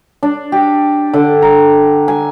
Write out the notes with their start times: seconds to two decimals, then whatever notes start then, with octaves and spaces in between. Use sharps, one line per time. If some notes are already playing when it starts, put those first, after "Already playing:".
0.23 D4
0.52 G4
1.13 D3
1.42 A#5
2.08 G#5